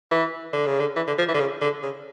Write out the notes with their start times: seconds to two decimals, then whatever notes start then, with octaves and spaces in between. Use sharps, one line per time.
0.11 E3
0.53 D3
0.66 C#3
0.80 D3
0.96 E3
1.07 D3
1.18 F3
1.29 E3
1.35 D3
1.40 C#3
1.61 D3
1.83 C#3